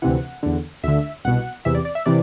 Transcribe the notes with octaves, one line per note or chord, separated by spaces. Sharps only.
D2 C3 E3 F#5
E2 D3
D2 D3 E5
C2 B2 F#5
E2 C3 E3 E5
D5
D5
E5
C3 E3 D5